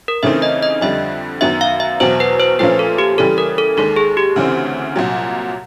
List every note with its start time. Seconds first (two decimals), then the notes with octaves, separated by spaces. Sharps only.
0.08 A#4
0.23 C#3 E3 A3 C4 D#4 E5
0.42 D#5
0.63 D#5
0.81 F2 D3 G3 E5
1.41 F#2 D#3 F#3 B3 E5
1.61 F5
1.80 E5
2.00 E2 B2 F#3 C5
2.20 B4
2.40 C5
2.59 A#2 F3 A3 C#4 F4 B4
2.79 A4
2.98 G4
3.18 C#3 E3 G3 A4
3.38 A#4
3.58 A4
3.77 D#2 D#3 G#3 A4
3.96 G#4
4.17 G4
4.36 D2 C#3 E3 A3 C4
4.96 C2 A#2 F#3